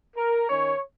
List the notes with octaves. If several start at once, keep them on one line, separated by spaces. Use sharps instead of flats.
A#4
D#3 C#4 C#5